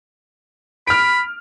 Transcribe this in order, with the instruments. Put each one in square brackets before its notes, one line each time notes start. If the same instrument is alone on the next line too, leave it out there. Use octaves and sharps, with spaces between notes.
[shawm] B5 [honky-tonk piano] F6 D7